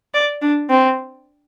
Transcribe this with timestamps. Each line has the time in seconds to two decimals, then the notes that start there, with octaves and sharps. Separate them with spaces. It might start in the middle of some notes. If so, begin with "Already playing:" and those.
0.14 D5
0.42 D4
0.70 C4